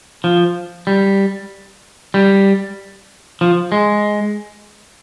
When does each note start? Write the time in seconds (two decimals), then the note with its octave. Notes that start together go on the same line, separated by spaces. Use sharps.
0.24 F3
0.87 G3
2.14 G3
3.41 F3
3.72 G#3